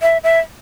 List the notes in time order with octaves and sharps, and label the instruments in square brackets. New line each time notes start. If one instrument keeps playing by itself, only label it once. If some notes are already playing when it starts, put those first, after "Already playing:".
[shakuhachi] E5
E5